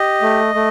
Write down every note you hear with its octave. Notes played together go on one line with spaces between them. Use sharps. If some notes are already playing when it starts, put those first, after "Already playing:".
Already playing: G4 D#5
A3
A3